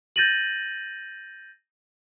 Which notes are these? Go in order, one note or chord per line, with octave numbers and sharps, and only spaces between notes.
G6 A6 A#6 D#7 F#7